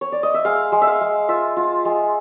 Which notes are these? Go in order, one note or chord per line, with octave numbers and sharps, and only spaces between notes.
C#5
D5
D#5
E5
G#3 F5
G#3
E5
F5
G#3
F4 E5
F4
G#3